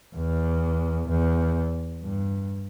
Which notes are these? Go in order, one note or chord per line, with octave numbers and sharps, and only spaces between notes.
E2
E2
G2